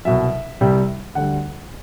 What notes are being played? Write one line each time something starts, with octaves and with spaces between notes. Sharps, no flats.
C2 B2 F#3 E5
C2 C3 G3
D2 D3 G3 F#5